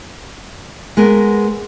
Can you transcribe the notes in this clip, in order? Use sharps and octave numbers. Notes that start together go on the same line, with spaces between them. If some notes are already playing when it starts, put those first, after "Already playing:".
G#3 B3 A#4